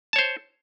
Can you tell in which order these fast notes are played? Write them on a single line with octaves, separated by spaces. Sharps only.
A5 C#5 C5